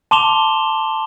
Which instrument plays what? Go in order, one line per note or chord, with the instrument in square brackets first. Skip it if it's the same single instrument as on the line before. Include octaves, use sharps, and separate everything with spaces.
[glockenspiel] A5 C6 D6 E7 F7 G7